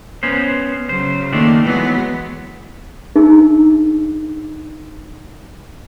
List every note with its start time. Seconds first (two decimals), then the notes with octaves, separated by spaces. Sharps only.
0.23 B3 C#4 C5
0.89 C#3 F#3 C5
1.33 D#3 A3 A#3 D4
1.66 E3 F#3 G#3 B3
3.16 D4 D#4 G#4 A#4 E5